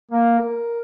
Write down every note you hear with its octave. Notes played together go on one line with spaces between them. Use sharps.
A#3
A#4